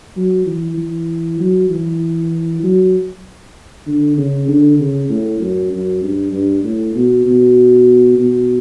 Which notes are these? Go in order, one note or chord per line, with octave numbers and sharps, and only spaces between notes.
F#3
E3
E3
F#3
E3
F#3
D3
C#3
D3
C#3
A2
F#2
F#2
G2
G2
A2
B2
B2
B2